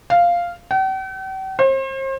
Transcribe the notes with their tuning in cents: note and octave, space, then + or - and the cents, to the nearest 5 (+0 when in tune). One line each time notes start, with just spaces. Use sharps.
F5 -5
G5 -45
C5 +40